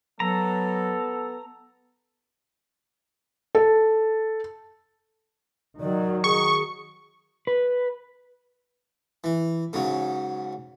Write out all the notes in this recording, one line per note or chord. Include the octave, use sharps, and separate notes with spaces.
F#3 B3 A4 A#5
A4
D#3 F#3 D5
G#4 C#6
B4
E3
G#2 C#3 F#3